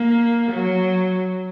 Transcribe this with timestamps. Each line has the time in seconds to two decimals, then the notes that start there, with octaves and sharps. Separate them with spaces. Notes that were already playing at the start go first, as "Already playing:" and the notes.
Already playing: A#3
0.52 F#3